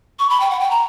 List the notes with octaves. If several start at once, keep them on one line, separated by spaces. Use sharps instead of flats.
C#6
B5
G5
F#5
G5
A#5